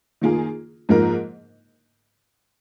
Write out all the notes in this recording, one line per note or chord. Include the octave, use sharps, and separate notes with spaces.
D#3 A#3 F4 G#4
G#2 F3 A#3 D#4 A#4